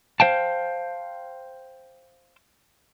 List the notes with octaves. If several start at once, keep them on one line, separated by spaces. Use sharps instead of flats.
C5 F5 G5 A5